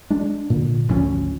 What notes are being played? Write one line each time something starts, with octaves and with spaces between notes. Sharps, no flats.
G#3 D4
A#2 D3
G#1 D2 F3 C#4